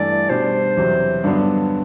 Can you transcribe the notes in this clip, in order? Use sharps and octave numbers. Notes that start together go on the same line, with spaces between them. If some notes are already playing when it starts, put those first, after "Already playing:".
Already playing: G2 E3 A3 D5
B2 G3 D4 C5
E2 C3 F#3
G2 D3 F#3 B3 D4